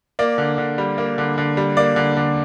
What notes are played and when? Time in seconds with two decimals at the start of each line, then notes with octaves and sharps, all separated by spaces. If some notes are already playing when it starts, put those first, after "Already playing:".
0.19 A#3 D5
0.38 D3
0.58 D3
0.78 G3
0.98 A#3
1.18 D3
1.38 D3
1.57 G3
1.77 A#3 D5
1.96 D3
2.17 D3